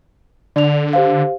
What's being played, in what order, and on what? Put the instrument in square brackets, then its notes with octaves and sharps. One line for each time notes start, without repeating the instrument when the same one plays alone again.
[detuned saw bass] D3 [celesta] D5 F7
[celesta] G4 C5 F5